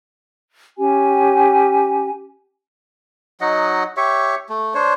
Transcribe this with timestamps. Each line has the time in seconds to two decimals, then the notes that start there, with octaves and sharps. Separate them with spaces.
0.78 C#4 G4 G#5
3.41 F#3 D#4 D#5 F#5
3.97 G4 C#5 E5 C#6
4.49 A3
4.74 D4 C5 C#5